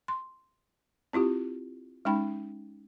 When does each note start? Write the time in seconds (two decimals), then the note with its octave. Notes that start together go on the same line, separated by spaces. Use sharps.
0.08 C6
1.13 C4 E4 F4 G4
2.05 G#3 C#4 D#4 G5 B5